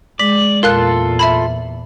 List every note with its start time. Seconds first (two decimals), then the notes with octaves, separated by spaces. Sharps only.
0.19 G#3 D5 B6
0.63 E2 A#2 F4 A4 A#4 F5 F#6
1.19 E5 A5 B5